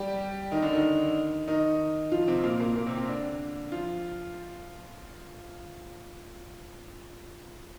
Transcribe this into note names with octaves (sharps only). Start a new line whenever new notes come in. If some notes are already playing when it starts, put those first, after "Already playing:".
Already playing: G3 G4
D#3 D#4
D3 D4
D#3 D#4
D#3 D#4
F3 F4
C3 C4
A#2 A#3
A#2 A#3
A#2 A#3
C3 C4
C3 C4
D3 D4
F3 F4